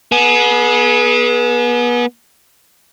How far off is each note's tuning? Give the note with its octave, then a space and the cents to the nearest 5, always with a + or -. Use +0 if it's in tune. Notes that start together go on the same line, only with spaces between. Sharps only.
B3 -30 G#4 +25